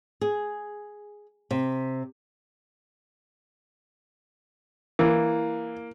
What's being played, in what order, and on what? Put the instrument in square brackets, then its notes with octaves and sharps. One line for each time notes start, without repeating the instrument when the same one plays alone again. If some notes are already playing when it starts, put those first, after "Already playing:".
[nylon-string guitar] G#4
C3
[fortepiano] E3 [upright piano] A#3 [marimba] E4 A#4